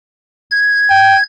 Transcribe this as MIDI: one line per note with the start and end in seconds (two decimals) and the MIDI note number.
0.51 1.23 92
0.89 1.16 79